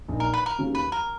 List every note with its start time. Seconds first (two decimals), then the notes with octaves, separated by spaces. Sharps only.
0.08 A#1 A#2 A#3 D#4
0.20 A#4
0.34 B4
0.46 A#4
0.58 D#2 C#3 F#3 C#4
0.75 B4
0.92 A#4